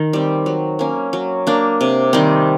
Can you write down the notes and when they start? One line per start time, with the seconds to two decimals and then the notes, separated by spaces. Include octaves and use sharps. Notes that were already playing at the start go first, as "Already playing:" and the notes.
Already playing: D#3
0.13 G3 C4
0.46 F#3
0.79 A#3 C#4
1.13 F#3
1.47 A#3 D4
1.81 C3
2.13 D#3 G3 C4